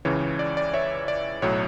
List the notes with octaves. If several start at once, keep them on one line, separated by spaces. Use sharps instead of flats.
C#2 C#3 E3 C#5
D5
D5
C#5 E5
D5
B1 A2 F#3 C#5